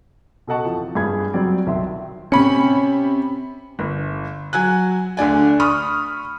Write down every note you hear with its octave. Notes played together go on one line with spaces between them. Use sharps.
B2 A4 D#5 F#5 A5 C#6
E3 F3 C4
G2 G#4 B5 G#6
F#2 F#3 G3 C4 D5
B1 D#3 E5 C6
C3 C#4 B5 C#7
G1
F#3 G#5 F#6
D2 D3 D5 G#5
B5 C#6 D#6 F6